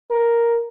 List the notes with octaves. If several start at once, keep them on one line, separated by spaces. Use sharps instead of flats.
A#4